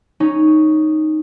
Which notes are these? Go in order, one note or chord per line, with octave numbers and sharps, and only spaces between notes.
C#4 D#4